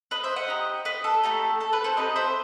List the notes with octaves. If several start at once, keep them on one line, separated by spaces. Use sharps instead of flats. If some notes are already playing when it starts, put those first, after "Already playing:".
B4 D#5
C5 E5
D#5 F#5
D#4 G4
B4 D#5
A4
A3 D#4 G4
A4
B4
A4 C5
C4 D#4 G4 B4 D#5
C5 E5